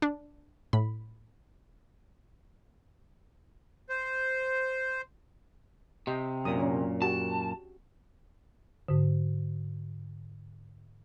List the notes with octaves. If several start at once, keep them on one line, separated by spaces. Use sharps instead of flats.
D4
A2 B5
C5
C3 G4 D#5 G5
F#2 A#2 D#6
C#4 D4
F#4 G4 G#5 A5
G#2 D3